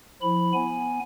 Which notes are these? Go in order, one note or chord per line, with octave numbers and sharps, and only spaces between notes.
F3 E4 B5
B3 G#5